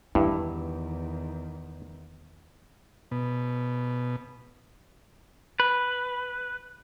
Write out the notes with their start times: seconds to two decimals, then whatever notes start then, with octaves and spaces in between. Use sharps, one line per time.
0.15 E2 G2 D#3 D#4 E4
3.11 B2
5.60 B4